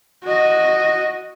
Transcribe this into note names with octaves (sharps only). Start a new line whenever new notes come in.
F#4 D#5